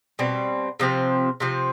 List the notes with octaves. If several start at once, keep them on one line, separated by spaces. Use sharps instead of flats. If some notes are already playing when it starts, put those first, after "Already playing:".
B2 G3 C4
C3 F3 C4
C3 F3 C4